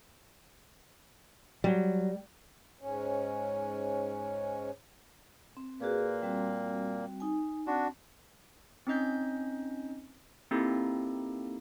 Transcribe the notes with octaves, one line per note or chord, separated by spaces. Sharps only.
F#3 G3
G#2 C#4
C4
A#2 A#3 F#4 G#4 B4
G3 C4 F#4
D#4 G#5
C4 D4 F#4
C4 C#4 D#4 D#5 G6 B6
A#3 C4 D#4 E4 G4 A4